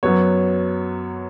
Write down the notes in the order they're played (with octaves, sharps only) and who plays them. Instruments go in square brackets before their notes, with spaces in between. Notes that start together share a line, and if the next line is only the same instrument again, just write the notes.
[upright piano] F#2 F#3 B3 C#5